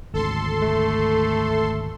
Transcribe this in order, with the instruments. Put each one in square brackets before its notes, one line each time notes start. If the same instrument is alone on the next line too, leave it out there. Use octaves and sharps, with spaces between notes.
[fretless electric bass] G#1 D2 [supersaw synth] A4 C6
[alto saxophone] A3